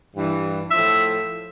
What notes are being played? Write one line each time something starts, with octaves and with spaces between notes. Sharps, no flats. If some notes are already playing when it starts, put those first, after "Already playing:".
G2 E3
A2 F3 E5